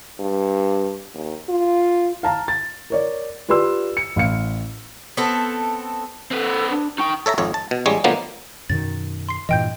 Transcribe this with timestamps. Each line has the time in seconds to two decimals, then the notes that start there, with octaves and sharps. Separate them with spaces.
0.20 G2
1.15 D#2
1.49 F4
2.23 F5 A5 A#5
2.48 A6
2.90 A#4 C#5 D5
3.48 F4 G4 B4 D5 C6 E6
3.97 C#7
4.16 A1 F5 C#7
5.17 B3 C4 A4
6.31 C4 A4 B4
6.70 D4
6.98 D#4 G5 C#6
7.26 A4 C#5 E5 A#5
7.38 G#1 F2 C#5
7.54 A5
7.71 B2
7.86 A1 G3 G#3 C#5
8.04 B2 D3 F3 F#3 A#3 B3
8.70 F#2 B2 D#3 A6
9.29 C6 C7
9.49 G2 A#2 E3 D#5 G5 G6